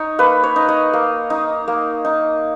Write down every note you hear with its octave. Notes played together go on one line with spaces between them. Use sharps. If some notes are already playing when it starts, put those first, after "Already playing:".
Already playing: D#4 C#5
A#3 B4
C#5
D#4
D#5
A#3
D#4
A#3
D#4